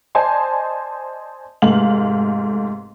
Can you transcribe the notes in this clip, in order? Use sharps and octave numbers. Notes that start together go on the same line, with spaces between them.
C5 D5 D#5 G#5 A5 C6
F1 G#2 A3 F5 F#7